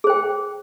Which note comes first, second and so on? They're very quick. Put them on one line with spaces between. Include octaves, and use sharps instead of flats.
G#4 C5 G5